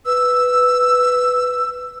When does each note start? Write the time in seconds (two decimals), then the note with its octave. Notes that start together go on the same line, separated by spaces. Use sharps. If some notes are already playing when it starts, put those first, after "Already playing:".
0.06 B4 E6